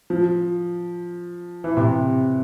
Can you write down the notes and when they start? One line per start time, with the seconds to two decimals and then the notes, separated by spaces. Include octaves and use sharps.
0.10 F3
1.64 E3
1.77 C3